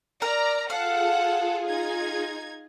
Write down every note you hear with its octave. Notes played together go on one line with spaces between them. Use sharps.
A#4 D5 A#5
F4 G#4 A4 F5 F#5
D#4 G#6